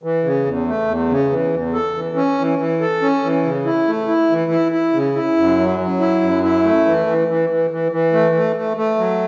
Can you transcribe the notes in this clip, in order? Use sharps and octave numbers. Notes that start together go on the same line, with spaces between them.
E3
C#3
E2
A3
E2
C#3
E3
E2
A4
E3
C#4
E3
E3
A4
C#4
E3
C#3
E4
A3
E4
E3
E4
E4
C#3
E4
F#2
F#3
F#3
E4
F#2
E4
A3
E3
E3
E3
E3
E3
E3
A3
A3
A3
A3
F#3